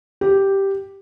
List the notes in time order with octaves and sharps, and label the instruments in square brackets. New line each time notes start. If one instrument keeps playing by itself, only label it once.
[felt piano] G4